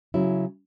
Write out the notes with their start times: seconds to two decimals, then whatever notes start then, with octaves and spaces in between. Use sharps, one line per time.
0.14 C#3 F#3 C#4 E4